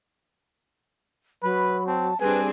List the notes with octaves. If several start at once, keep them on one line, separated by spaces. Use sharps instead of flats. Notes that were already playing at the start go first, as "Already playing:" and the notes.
F#3 B4 B5
C4 A5
G3 C4 D4 G#4 B4 G#5